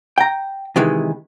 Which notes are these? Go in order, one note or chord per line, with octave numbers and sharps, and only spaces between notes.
G5 A#5
C3 D#3 E3 G#3